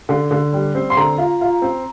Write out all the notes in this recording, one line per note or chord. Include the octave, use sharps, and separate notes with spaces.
D3
D3
G3
C4
C6
D3 A#5
F4
F4
C4